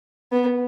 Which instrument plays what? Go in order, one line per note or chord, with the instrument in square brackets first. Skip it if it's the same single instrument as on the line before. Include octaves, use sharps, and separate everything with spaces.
[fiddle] B3